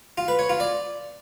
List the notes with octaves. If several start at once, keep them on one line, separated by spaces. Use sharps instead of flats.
F4
B4
C#5
F4
D5